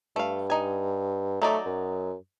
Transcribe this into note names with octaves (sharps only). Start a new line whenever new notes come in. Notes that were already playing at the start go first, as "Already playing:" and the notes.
G2 A3 F5
D#4 G#5
F#3 A3 D#4 D5
F#2